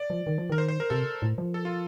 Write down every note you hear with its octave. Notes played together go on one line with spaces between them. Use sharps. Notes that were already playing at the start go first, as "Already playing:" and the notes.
Already playing: D5
F3
D#3
F3
D#3 A#4
C5
C5
A#4
C3 A4
A2
F3
A4
F4